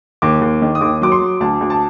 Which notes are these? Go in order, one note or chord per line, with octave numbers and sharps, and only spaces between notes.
D#2 D6
D#2
D#3
D#6
D#2 D6
F#3 D6
C6
F#3
D2 A5
D2
A5